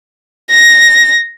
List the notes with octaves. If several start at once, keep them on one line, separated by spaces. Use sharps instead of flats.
A#6